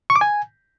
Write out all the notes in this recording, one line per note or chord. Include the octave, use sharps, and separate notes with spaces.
C#6
D6
G#5